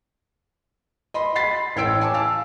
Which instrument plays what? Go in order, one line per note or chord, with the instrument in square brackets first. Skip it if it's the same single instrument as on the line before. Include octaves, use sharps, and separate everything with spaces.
[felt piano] D#5 B5 C6
B5 C6 A6 B6 C7
A1 C#5 G5 E6 D7
G#5 A5 D6
F5 A5 E6